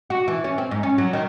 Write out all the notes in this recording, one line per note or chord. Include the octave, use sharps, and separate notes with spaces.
F#4
E3
C#4
C4
G#2
C#4
F#3
D#3